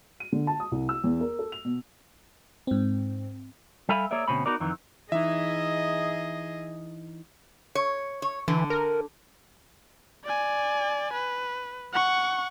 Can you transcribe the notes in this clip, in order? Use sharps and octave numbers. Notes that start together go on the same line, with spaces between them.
D#7
D3
A5
D#6
C2
E6
E2
A#4
A4
F7
B2
G#2 C4
G3 A4 E5 F5 G#5 B5
A#3 G#4 C#5 D5 E5
D2 B2 C4 C#4 B5
B3 D#4 F#4 A#4 D5
F2 D#3 E3
E3 D#4 G#4 D#5 E5
C#5
C#5
D3 E3
A#4
D5 G#5
B4
F#5 C#6